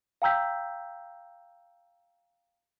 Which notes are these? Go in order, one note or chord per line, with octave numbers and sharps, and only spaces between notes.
F5 G5 A#5 E6 G6 B6